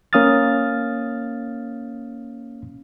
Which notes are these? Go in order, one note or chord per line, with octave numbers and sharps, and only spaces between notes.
A#3 C#4 F5 D#6 F6 A6